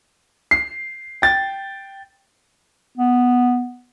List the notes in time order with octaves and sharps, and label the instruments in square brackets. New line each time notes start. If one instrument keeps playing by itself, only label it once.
[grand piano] C7
G5 A6
[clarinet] B3